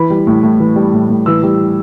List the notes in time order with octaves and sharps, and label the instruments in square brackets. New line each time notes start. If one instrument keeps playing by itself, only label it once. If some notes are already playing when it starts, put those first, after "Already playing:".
Already playing: [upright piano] E3 B5
G3
A2
A2
E3
G3
A2
A2
E3 E6
G3